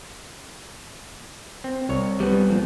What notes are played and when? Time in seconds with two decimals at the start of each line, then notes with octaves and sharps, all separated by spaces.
1.64 C4
1.89 C2 C#5
2.20 G3 B3
2.50 A#2 F3